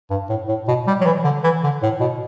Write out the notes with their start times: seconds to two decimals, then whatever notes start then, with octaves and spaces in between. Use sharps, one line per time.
0.11 G2
0.30 A2
0.49 A2
0.68 B2
0.87 G3
1.01 F#3
1.06 E3
1.25 D3
1.44 E3
1.64 D3
1.83 A2
2.01 B2